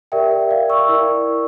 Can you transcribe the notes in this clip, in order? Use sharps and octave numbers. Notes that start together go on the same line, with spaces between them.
G4 A#4 D5 E5 G5
E5
D5 F5
C#6 E6
E4 A#4 D5